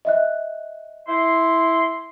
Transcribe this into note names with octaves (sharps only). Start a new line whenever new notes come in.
D#5 E5 F#6
E4 C6